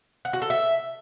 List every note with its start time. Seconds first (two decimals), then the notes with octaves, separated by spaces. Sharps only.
0.25 F#5
0.33 F#4
0.42 A4
0.50 E5